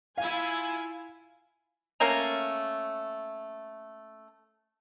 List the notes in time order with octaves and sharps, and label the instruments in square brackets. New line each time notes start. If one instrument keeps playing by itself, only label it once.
[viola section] E4 F4 G#5 [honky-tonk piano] F5
[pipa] A3 A#3 C#4 A#5